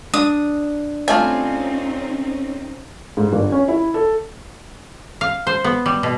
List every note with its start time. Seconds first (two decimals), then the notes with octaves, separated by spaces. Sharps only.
0.14 D4 D#6
1.08 G3 A3 C4 C#4 D#4 F4 G#5
3.17 G#2
3.33 G1
3.52 C#4
3.68 E4
3.94 A4
5.21 F5
5.47 C5
5.64 B3
5.86 G3
6.03 B2